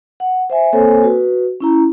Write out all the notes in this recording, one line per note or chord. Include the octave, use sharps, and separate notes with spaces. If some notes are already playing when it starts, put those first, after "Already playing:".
F#5
C5 E5 G#5
A#3 C4 A4 C5 C#5 G#5
F#4 B4
C#4 E4 A#5